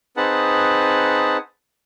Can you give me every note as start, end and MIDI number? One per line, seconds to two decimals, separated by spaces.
0.17 1.37 60
0.17 1.37 63
0.17 1.37 68
0.17 1.37 71
0.17 1.37 78
0.17 1.37 81